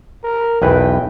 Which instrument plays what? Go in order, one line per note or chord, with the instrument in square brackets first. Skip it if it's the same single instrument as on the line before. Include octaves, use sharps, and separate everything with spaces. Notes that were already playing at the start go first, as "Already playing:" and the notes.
[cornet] A#4
[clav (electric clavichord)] B1 E2 B4 [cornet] G5